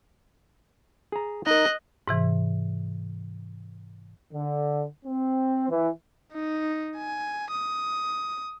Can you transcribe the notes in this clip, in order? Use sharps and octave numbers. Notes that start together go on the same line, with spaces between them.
G#4 A#5
D#4 A#4 D#5 F#6
G#2 C3 E3
D3
C4
E3
D#4
G#5
D#6